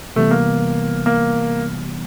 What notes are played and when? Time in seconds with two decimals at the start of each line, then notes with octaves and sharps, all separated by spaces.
0.16 C3 E3 G3 A3 B3
0.31 A#3
1.06 A#3